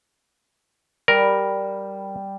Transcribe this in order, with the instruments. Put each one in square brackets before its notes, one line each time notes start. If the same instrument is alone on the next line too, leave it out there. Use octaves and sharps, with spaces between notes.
[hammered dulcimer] G3 [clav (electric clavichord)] A#4